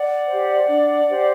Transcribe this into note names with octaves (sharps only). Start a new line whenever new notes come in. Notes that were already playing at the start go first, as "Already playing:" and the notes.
Already playing: D5 F#5
G4 C5
D4
G4 C5